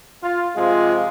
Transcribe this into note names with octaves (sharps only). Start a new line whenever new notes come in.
F4
C3 F3 G#3 F4